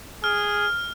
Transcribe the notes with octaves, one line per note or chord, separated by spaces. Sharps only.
G#4 F6